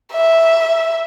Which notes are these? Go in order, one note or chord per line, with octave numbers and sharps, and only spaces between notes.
E5